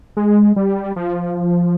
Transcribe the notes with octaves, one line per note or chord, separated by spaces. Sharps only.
G#3
G3
F3